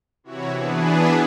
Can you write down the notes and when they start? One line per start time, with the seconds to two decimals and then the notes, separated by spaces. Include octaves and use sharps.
0.24 C3 E3 E4 F#4 C#5
0.53 E3 B3 D4 G#4 B4